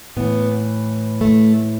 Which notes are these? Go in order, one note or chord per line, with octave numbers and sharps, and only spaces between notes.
A2 E3 B3
A3